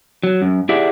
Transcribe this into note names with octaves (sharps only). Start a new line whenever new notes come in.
F#3
F#2
E4 G4 G#4 D5 E5 F#5